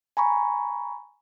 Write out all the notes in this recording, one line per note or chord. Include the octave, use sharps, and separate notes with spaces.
G#5 A#5 B5 C#6